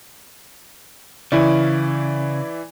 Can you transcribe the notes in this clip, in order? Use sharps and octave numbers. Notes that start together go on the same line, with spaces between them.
C#3 E3 E4 D5